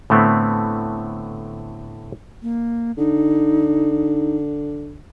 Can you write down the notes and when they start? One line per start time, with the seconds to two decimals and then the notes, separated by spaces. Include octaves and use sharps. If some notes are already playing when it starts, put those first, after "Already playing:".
0.10 A2 D3 A3 B3 C4
2.42 A#3
2.98 D3 D#4